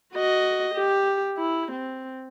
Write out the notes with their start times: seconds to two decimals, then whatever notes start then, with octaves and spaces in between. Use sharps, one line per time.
0.14 F#4 D#5
0.75 G4
1.38 E4
1.72 C4